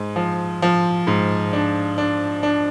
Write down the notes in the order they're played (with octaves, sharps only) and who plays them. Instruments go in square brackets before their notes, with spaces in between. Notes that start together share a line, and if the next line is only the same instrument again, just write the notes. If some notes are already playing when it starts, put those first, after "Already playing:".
Already playing: [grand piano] G#2
F3
F3
G#2
D4
D4
D4